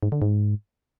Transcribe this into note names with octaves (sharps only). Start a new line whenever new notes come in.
G#2
D3
G#2